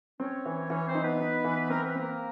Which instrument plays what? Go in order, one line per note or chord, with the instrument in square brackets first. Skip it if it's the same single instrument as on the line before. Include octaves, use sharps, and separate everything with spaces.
[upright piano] C4 [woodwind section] C#4 C#5
[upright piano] E3
[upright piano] E3 [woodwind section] C#4 C#5
[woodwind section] C4 C5
[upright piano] D#4
[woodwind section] B3 B4
[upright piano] D#4
E3
[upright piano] C4 [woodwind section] A#4
[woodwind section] B4
[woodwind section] A#3 A#4 [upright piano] C4